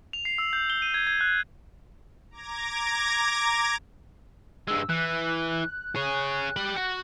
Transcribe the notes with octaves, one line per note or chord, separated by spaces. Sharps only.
F7
C7
E6
G6
G7
D#7
G#6
G#6
F#6
A#5 D6 G#6 A#6
G2 G#3 E6
E3 F#6
G#4 C#5
G4 B5
F#4 F#5